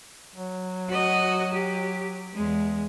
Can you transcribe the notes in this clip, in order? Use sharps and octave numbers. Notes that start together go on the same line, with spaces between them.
F#3
F#4 D#5
G4
E2 G#3